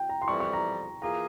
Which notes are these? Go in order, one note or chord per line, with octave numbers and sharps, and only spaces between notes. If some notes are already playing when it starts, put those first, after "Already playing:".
Already playing: G5
A#5
C6
F2 E3 G3 C#6
C#6
A#5
E3 A#3 F4 G#4 A#5